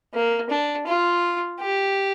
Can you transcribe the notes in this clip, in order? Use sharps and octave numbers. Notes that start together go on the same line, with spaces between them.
A#3
D4
F4
G4